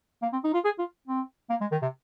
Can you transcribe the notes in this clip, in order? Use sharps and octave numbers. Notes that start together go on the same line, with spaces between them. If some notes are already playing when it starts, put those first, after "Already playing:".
A#3
C4
D#4
F4
G#4
F4
C4
A#3
G#3
D#3
C3